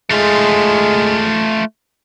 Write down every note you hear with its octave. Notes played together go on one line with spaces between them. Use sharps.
G#3 A3 F4